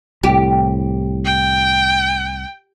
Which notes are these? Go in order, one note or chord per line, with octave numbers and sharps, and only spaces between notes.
C2 A2 G4
G5